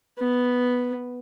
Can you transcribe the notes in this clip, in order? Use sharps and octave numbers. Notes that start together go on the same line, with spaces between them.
B3